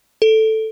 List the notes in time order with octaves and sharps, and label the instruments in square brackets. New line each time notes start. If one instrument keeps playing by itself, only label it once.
[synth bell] A4